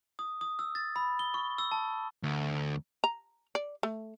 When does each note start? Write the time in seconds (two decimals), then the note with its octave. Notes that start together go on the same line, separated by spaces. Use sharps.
0.19 D#6
0.41 D#6
0.59 E6
0.75 A6
0.96 B5
1.19 G7
1.34 C#6
1.58 E6
1.72 A5
2.23 D2
3.04 A#5
3.55 D5
3.83 A3